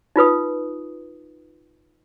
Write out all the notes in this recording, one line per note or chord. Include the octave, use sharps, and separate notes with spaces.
D#4 F4 B4 D#6